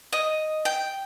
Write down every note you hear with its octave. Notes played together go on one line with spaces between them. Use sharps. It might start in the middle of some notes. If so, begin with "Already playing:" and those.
D#5
G5